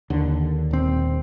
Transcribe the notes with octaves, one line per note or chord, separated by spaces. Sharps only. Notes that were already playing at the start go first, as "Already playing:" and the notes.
D#2 D3
D#1 C4